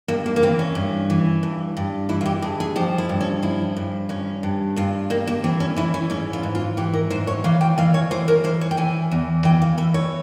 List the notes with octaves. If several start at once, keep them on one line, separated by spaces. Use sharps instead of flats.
G2 A#3
A#3
A#3
E3 C4
C#4
G2
E3
G2
G2
E3 E4
F4
G4
G2 G#4
G#4
F3 G4
E4
G2
C#4
F3 E4
G2
G2 C#4
G2
G2 F4
G2 A#3
A#3
E3 C4
C#4
E3 E4
C#4
G#2 C#4
F4
G#2
F4
E3 G4
A#4
G#2 C5
C#5
E3 F5
G5
E3 F5
C#5
E3 C5
A#4
E3 C5
C#5
G5
E3 G#5
E2
E3 G5
F5
E3 E5
C#5